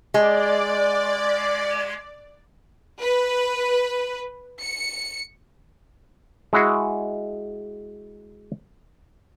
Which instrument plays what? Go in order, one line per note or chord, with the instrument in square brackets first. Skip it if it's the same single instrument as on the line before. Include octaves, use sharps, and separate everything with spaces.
[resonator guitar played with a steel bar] G#3 [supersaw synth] D5
[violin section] B4
C#7
[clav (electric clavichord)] G#3 E4 F#4 G#4